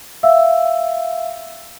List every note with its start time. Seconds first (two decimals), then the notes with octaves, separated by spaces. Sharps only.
0.23 E5 F5 E6